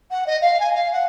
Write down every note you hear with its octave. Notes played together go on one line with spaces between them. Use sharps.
F#5
D#5
F5
G#5
F5
F#5